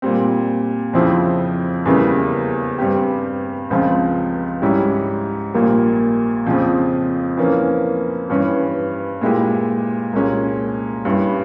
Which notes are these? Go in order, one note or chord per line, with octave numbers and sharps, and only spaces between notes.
A#2 G3 C4
F2 C#3 F3 C4 E4
E2 C#3 G3 A#3 E4
G2 G3 C4 G4
C#2 C#3 F3 C4 F4
G#2 G3 C#4 E4 G4
A#1 A#2 G3 A#3
F2 C#3 F3 C4
F2 E3 A#3 C#4
G2 E3 G3 C#4
A#2 G#3 E4 G4
C2 A#2 G#3 C#4
G2 G3 C#4 E4 G4